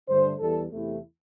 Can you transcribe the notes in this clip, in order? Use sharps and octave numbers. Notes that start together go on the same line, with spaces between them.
G2 D3 A3 D4 C5
E2 E3 G3 A4
E2 C3 A3 E4